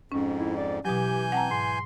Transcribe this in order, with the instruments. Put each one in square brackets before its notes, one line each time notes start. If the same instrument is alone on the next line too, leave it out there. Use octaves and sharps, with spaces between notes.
[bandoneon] F2 G#2 [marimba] C#4
[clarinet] E4
D5
[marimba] B2 F#3 [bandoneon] E3 G#5 G6 [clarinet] G4
[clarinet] C4 [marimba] F#5 A5 A#5
[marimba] G#2 [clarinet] C6